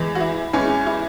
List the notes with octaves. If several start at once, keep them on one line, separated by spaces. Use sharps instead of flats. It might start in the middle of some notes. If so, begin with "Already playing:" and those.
Already playing: E2 E3 G#3
F#4
E4
E2 E3 G#3 C#4
E4